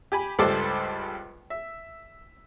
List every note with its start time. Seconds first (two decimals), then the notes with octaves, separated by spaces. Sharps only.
0.12 G4 G#5 B5
0.39 C#2 G2 G3 A4 C5 D6
1.50 E5